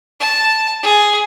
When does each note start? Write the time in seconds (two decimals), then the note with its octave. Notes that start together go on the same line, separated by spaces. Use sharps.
0.21 A5
0.83 G#4